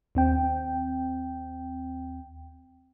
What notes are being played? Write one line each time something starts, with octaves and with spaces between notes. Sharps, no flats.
D#2 C4 G5